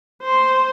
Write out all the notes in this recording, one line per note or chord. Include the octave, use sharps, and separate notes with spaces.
C5